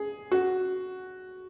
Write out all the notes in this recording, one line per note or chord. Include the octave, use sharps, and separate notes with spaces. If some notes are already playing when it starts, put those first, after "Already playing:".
Already playing: G#4
F#4